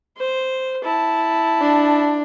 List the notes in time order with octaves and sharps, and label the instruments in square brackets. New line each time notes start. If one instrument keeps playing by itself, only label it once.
[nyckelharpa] C5
E4 A5
[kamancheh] D4